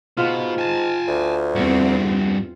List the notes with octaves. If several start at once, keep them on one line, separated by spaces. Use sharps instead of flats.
G#2 B2 F4
G#5 A5
D2
E2 G2 C4 F#4